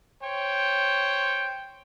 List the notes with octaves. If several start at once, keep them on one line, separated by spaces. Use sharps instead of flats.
C5 C#5 G5